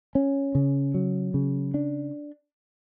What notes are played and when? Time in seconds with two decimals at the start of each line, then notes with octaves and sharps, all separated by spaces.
0.15 C#4
0.55 C#3
0.94 F#3
1.34 C#3
1.74 D4